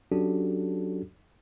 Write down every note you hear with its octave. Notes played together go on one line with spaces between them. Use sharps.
F#3 C#4 D4 F#4 G4 A4